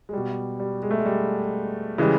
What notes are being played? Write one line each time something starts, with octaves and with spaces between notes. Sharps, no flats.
G#3
B2 G3
G3
G#3
A3
G#3
G3
C#3 E3 G3 G#3